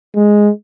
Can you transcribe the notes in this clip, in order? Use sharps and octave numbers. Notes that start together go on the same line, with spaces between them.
G#3